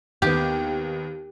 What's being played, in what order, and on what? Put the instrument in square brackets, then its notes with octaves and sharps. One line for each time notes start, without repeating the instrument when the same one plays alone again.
[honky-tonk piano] D#2 B3 [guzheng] G4